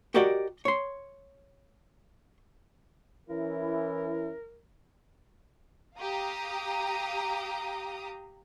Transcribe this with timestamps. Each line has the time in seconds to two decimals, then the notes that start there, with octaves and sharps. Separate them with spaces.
0.14 F#4 G4 A#4 D5 D#5 F#5
0.65 C#5 C6
3.29 E3 C#4 E4 A#4
5.97 G4 F5 A#5 D#6